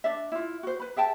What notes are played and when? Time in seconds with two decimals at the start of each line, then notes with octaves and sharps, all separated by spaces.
0.04 D4 D5 E5
0.32 E4 F4
0.63 F#4 C5
0.80 B4 B5
0.96 G#4 E5 G5 A5